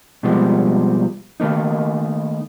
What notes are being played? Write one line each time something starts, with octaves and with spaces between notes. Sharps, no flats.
B2 F3 G3 G#3 C4
D#3 A3 A#3 D#4